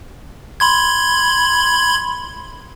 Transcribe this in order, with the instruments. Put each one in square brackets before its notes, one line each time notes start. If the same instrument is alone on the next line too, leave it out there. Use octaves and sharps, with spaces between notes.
[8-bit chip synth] B5 C6 G#6